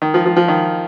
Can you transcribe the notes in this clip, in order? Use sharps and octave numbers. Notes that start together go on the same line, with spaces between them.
D#3
F3
F3
F3
D#3